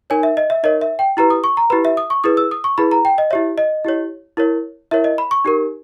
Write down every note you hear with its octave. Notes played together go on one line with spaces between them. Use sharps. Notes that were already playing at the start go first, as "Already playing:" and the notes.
D#4 A#4 C#5 G#5
E5
D#5
E5
D#4 A#4 C#5 D#5
E5
G5
E4 G4 B4 A#5
D#6
C#6
A#5
E4 G4 B4 B5
E5
D#6
C#6
E4 G#4 B4 D#6
E6
D#6
C#6
E4 G#4 B4 B5
A#5
G5
D#5
E4 G4 C#5 E5
D#5
E4 G4 C#5
E4 A#4 C#5
E4 A#4 C#5 E5
D#5
B5
C#6
D#4 G4 A#4